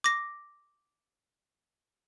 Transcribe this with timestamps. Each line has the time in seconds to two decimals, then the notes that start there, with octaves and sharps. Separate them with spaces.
0.04 D6 A#6